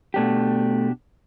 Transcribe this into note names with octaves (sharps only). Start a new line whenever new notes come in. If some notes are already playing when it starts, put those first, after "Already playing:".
B2 A3 D4 G4